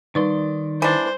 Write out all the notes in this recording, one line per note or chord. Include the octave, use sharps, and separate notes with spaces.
D#3 G3 D#4 B4 D5 C6
E3 D4 C5